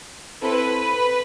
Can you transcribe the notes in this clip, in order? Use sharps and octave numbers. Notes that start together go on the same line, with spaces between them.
C4 E4 A4 B4